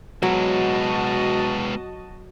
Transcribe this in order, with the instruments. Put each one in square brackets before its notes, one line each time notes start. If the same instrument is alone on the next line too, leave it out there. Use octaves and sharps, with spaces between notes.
[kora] F#3 [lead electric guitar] G#3 B3 [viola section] F#4 D#5 A5